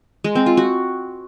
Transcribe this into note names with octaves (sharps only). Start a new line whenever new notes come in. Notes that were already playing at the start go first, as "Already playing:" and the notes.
G#3
C4
F4
F#4